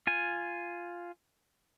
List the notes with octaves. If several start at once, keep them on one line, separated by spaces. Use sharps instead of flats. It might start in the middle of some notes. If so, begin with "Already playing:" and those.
F4 G#5